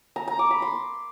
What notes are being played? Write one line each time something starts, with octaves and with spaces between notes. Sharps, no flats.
A#5
A#5
D6
B5
C6